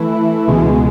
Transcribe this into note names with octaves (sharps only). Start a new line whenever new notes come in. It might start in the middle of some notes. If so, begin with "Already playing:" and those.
Already playing: E3 A3 E4
C#2 B2 G#3